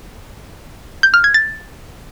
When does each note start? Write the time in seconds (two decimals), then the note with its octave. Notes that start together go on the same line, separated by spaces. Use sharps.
1.03 G6
1.14 F6
1.24 G#6
1.34 A6